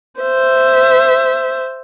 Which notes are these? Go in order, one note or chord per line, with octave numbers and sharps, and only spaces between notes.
C5 E5